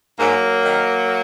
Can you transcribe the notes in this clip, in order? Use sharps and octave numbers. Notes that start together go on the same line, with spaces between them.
G#2 F#3 A#3
D#3